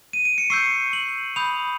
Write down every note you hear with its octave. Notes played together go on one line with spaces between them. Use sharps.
D#7
D7
C#7
C#6 E6 G6 C7
F#7
B5 D#6 G6 F7